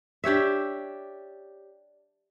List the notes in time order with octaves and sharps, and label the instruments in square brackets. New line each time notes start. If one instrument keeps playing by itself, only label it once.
[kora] D4 G4 C#5 E5